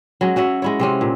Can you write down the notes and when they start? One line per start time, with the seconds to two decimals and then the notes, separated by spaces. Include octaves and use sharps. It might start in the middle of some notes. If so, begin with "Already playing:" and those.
0.21 F#3 G#3 C#4
0.36 C#4 F#4 C#5 E5
0.62 G#3 E4 C#5
0.79 C3 C4 C#4
1.01 A#2